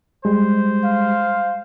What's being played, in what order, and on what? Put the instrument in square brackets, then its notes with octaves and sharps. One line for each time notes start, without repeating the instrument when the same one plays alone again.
[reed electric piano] G3 G#3 [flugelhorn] C5
[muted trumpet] F5